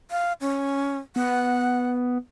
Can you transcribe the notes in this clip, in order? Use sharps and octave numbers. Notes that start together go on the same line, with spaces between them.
F5
C#4
B3 F#5